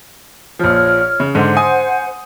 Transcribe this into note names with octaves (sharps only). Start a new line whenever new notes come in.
A#1 F3 C#5 F6
C#3
G#2 D3 C5 F#5
G#5 D#6